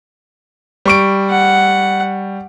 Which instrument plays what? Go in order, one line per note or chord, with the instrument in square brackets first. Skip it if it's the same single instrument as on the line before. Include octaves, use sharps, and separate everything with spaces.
[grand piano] G3 C#6 D7
[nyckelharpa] F#5